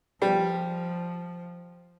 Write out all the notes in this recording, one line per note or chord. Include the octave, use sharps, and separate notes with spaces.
F3 G3